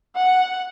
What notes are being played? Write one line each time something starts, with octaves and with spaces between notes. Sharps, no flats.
F#5